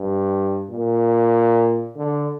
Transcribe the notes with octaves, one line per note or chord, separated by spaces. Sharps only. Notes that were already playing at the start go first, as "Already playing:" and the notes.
Already playing: G2
A#2
D3